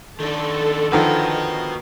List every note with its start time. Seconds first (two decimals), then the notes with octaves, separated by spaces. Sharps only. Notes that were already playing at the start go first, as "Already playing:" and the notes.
0.20 D#3 D4 A4
0.92 D3 D#3 F3 F#4 B4